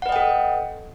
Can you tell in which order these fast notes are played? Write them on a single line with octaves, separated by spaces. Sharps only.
F#5 B4 D#5 G5 A4